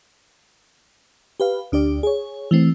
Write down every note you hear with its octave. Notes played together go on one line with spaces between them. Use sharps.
G4 B4 F5
D2 D4 G4 D5
G#4 C#5
E3 A3 C4